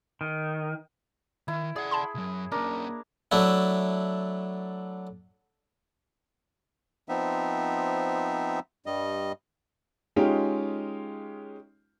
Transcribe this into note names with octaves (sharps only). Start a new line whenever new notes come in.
D#3
D#3 E4
G#4 D5 F#5
A5 B5 C6
C2 F#2
A#3 C#4 D4 A#4
F#3 A3 D4 E4
F3 B3 C4 D#4 E5
G2 G3 D#5
G#3 C#4 D#4 F4 G4